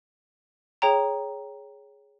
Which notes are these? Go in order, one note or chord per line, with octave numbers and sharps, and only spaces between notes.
G#4 C#5 G5 A#5